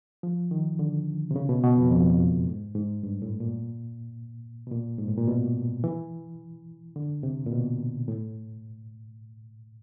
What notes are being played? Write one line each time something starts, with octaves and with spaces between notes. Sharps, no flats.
F3
D#3
D3
C3
C#3
B2
B2
F2
F2
F2
F#2
G#2
G#2
G2
A2
A#2
B2
A#2
G#2
A2
A#2
B2
E3
D3
C3
A#2
B2
A2